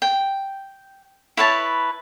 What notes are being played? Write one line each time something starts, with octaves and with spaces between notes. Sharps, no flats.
G5
E4 B4 C#5 A5